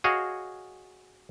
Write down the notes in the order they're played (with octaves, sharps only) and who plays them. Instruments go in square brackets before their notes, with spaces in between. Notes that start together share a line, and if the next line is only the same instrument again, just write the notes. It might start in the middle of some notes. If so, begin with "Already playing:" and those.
[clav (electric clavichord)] F#4 G#4 C#5 D#5 F5